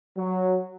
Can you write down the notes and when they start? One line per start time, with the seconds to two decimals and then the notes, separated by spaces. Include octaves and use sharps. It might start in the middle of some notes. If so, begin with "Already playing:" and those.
0.16 F#3